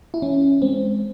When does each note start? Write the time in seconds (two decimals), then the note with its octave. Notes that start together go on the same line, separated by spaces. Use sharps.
0.14 E4
0.22 E3 C#4
0.62 G#3 C4